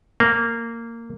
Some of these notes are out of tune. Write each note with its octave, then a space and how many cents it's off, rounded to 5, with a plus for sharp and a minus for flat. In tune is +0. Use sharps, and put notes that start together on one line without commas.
A#3 -15